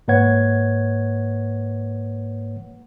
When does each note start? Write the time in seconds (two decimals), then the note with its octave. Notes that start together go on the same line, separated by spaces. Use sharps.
0.08 G#2 A#3 B4 C#5 F#5 G#6